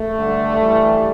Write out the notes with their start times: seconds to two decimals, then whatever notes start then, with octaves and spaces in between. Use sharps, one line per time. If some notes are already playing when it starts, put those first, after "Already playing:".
Already playing: A3
0.19 G2 D3 G3
0.60 G2 E3 G3